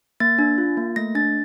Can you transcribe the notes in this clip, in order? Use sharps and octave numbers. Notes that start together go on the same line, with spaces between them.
A#3 A6
D4
F4
A#3
A3 A#6
D4 A6